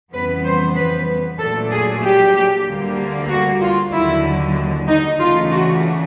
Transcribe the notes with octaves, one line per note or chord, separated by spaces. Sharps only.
F2 C#3 E3 G3 B3 B4
C5
B4
A#2 F#3 A3 D4 A4
G#4
G4
D2 D3 G3 A#3
F#4
F4
D#2 D3 F#3 E4
D#4
C#3 E3 A3 D4 F4
F#4